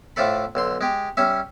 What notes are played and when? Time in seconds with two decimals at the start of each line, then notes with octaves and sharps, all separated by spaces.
0.16 A2 F3 A3 D4 A4 B5
0.55 B1 D3 C6
0.81 G#3 G4
1.17 G3 C#4 E5